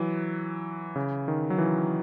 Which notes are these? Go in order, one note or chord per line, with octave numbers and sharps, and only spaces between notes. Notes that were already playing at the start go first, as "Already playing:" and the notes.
Already playing: E3 F#3
C#3
D#3
F#3
E3